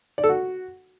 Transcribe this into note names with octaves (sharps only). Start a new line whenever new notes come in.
D5
A4
F#4